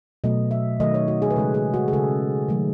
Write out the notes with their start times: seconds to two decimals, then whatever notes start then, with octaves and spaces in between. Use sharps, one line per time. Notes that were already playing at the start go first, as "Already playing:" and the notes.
0.24 B2 F#3 A3 D#5
0.51 E5
0.80 D#3 F#3 A3 D#5
0.94 C#5
1.08 F#4
1.22 G#4
1.30 B4
1.36 C#3 G#3 A4
1.54 G#4
1.74 F#4
1.88 G#4
1.93 C#3 G#3 A4
2.48 D#3 F#3 A3